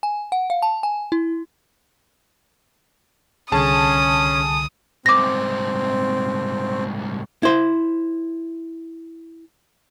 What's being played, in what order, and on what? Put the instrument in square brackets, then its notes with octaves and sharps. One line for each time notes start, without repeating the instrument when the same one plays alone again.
[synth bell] G#5
F#5
F5
A5
G#5
E4
[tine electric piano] C2 D3 [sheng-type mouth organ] C#4 [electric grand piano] G#4 A5 [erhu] D#6
[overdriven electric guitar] C2 G#2 [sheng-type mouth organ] C4 [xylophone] D6 A#6
[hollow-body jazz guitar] E4 C5